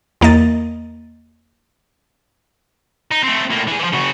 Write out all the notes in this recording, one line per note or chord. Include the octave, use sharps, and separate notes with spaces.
E2 A#3 A#4 D#5 A6
D#4
A3 C4
A2 A#3
E3 G#4
E3 F3
C#3 F#4